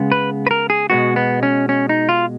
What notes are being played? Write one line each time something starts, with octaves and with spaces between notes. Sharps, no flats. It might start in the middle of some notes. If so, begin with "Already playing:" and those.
Already playing: C#3 G#3 B3
B4
B4
A#4
G#4
B2 G#3 B3 F#4
B3
C#4
C#4
D#4
F4